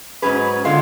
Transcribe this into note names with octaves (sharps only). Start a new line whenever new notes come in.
G#2 F#3 C#4 G#4 B4
D3 G#3 B3 F4